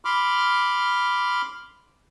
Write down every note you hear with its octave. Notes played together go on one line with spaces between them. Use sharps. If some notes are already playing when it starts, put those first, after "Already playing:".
B5 C6 D6 F6